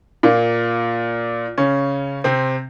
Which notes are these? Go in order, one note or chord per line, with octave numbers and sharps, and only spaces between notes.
A#2 A#3
C#3 C#4
C3 C4